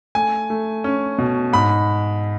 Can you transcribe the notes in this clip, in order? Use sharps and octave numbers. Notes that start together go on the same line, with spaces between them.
A3 G#5
A3
C#4
B2
G#2 B5